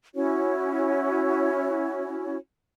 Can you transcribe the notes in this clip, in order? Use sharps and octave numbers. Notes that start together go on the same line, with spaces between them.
C#4 E4 F#4 C#5